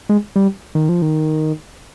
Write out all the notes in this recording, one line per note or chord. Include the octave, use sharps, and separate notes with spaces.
G#3
G3
D#3
F3
D#3